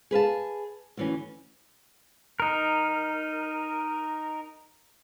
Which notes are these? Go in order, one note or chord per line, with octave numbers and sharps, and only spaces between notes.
G#4 B4 F5 A5
D2 E3 C#4
D#4 A#4